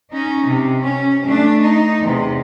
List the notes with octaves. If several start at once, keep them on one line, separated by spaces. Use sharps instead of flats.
C#4 D#4
C3
C#4
A3 D4
D#4
E2 C3